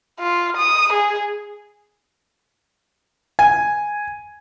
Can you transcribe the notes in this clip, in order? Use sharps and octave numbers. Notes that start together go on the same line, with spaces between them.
F4
D#6
G#4
G#5